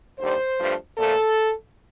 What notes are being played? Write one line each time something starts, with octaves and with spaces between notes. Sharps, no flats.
D#2 D3 G3 C5
G2 F3 A3
A#2 F3 A3 A4